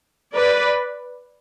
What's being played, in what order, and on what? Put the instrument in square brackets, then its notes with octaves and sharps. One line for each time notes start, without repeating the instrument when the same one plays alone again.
[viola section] B4 D5